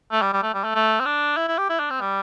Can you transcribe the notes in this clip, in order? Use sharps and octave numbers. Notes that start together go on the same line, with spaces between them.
A3
G3
G3
A3
G3
A3
A3
C4
D4
E4
E4
G4
E4
D4
C4
G3